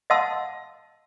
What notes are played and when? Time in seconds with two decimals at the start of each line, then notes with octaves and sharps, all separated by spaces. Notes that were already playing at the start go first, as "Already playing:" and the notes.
0.10 D#5 F5 F#5 A5 C6 E6